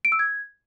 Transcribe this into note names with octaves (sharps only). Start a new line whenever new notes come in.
D7
E6
G#6